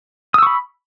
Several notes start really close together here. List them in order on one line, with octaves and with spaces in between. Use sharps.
D#6 E6 C#6 B5